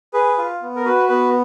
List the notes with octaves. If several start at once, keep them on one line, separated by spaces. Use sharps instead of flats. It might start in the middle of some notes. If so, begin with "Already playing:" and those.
G#4 B4
F4
B3
A#4
F#4 B4
B3 B4